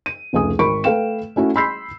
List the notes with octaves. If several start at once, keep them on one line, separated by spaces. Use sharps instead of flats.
D#7
F1 C#2 A3 G#5 D#6
G#1 A#4 B5 C#6 D7
A3 A4 B4 F5 G5 E7
A3 C#4 E4 F#4
B5 C6 E6 G6 B6 C7